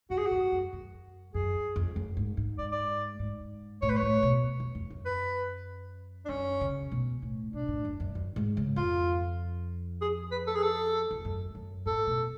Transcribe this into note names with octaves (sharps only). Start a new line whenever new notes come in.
F#2 F#4
G#4
F#4
F#2
F#2
F#2
F#2 G#4
F2
F#2
G#2
G#2
D5
D5
G#2
A2 C#5
B4
C#5
A2
B2
F2
F2
F#2
B4
D4
F#2 C#4
C#3
B2
A2
B2 D4
A2
F#2
F#2
F#2
G#2
C#3
F2 F4
G#4
B4
A4
G#4
A4
F2
F#2
F#2
A2 A4
B2